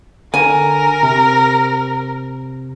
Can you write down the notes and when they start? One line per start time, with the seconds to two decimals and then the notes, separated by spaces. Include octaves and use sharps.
0.34 D3 A#4 G#5
1.03 C3